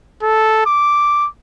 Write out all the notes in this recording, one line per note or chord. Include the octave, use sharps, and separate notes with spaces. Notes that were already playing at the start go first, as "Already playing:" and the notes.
A4
D6